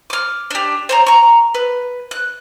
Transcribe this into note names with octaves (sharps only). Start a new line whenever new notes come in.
D6 F6
D4 G4
C5 C#5 A#5
A#5 C#6
B4
F#6